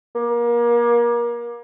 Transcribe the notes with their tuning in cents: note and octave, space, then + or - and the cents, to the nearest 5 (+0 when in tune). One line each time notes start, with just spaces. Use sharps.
A#3 +30